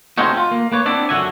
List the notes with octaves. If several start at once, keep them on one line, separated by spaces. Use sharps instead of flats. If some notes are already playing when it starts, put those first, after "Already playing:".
C3 A3 C4 C#4 D#4 F#4
F4
A#3
A#3 B4 C#5
B3 C4 D4 E4 D5
F#2 D3 F#3 F#4 E5 G#5